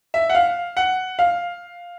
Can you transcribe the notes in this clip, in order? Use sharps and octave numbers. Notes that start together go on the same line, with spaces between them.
E5
F#5
F5
F#5
F5